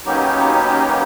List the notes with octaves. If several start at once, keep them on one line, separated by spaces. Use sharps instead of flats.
F#3 A#3 B3 C#4 D#4 G4